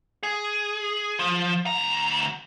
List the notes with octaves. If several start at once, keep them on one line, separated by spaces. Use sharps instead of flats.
G#4
F3
D2 A#5